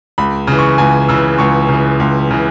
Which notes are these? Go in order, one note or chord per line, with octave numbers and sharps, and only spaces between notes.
C#2 B5
C#3 E3
C#6
C#2 G#5
C#3 E3 E6
C#2 C#6
C#3 E3
C#2
C#3 E3